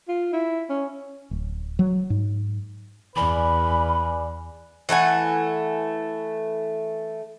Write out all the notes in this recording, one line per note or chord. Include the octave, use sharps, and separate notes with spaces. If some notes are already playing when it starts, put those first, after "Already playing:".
F4
E4
C#4
D1
F#3
G#2
E2 B4 D5 G#5 B5 D6
E3 A3 F#5 G#5